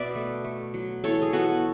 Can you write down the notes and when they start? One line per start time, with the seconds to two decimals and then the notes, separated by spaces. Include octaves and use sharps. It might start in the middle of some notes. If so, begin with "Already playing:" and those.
Already playing: B2 B4 D5 E5
0.15 A3
0.44 A3
0.74 F#3
1.04 E3 A4 C#5
1.22 G#4
1.33 B3 F#4 A4